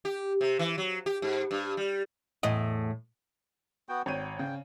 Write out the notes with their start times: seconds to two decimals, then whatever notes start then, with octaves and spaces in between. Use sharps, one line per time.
0.05 G4
0.41 C3
0.59 E3
0.78 F#3
1.06 G4
1.22 G#2
1.51 G2
1.77 G3
2.43 E2 A2 D#5
3.89 B3 F#4 G5
4.06 G#1 C#5 G5 D#7
4.39 C#3 G5